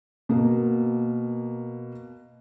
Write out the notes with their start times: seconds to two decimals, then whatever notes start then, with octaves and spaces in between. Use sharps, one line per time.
0.29 B2 A#3